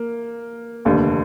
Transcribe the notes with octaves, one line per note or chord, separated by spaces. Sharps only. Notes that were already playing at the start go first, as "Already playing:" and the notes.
Already playing: A#3
F1 D#2 D3